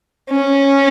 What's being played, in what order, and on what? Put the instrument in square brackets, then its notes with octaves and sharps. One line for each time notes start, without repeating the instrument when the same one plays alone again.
[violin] C#4